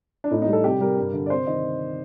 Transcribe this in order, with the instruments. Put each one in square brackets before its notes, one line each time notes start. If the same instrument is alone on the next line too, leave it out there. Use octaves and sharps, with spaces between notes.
[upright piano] D4
A2 D#4
D#4
G3
A4
C3 G4
G3 A#4
G2
D3
D5
C3 C5
D#3 D#5